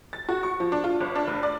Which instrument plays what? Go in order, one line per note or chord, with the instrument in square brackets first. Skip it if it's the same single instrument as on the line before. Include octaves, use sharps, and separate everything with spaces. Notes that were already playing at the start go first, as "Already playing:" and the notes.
[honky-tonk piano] A6
F#4
C#6
F3
D4
F4
G1
D4
F1
D5